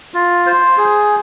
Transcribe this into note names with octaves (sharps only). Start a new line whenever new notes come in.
F4
C5
G#4